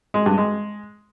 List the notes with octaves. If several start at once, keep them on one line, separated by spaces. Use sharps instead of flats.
G#3
G2
G#3